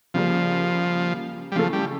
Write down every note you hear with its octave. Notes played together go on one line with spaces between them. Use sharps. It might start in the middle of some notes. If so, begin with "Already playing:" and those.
C#3 F3 G3 A#3
G3
C#3 E3 F3 A3 E4 A4
G3